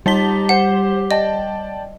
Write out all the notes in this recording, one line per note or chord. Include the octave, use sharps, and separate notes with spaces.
G3 D#4 G4 A5 B6 G7
C5 F#5 C7
D5 D#5 G5 A5